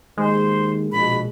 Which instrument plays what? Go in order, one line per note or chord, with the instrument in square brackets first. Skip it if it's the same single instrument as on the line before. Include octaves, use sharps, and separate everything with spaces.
[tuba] D#2 [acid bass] G#3 [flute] C5
[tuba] A#1 [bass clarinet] B2 [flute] B5